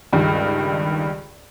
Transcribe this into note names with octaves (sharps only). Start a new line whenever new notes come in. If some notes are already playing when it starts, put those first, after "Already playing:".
C#2 G2 D#3